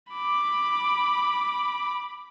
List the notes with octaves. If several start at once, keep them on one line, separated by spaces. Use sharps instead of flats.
B5 D6